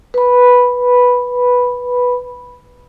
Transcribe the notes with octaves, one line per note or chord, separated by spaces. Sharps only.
B4 B5